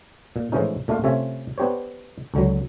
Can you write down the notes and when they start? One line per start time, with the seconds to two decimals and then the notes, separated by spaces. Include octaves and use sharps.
0.36 A#2
0.52 A2 E3 F3 G#3 C#4 D#4
0.88 A#2 A3 D4 F4 F5
1.04 C3 A3 C#4 F4 E5 G#5
1.58 B3 D4 G4 C5 C#5
2.34 C#2 D3 F#3